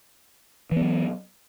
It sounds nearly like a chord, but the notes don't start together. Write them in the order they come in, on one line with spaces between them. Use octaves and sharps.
E3 B3 F#3